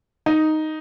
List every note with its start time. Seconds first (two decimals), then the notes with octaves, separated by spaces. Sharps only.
0.26 D#4